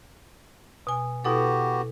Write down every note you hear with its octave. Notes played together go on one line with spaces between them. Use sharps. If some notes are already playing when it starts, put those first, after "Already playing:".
B2 G#5
B2 B3 E4 F#4 G4 A4